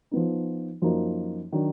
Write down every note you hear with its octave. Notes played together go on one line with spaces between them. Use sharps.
F3 B3 D#4
F#2 F3 A#3 D#4
D#3 F#3 D4